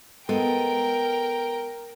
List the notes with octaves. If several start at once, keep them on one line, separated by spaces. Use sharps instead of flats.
G#3 B3 A4 A#4 G5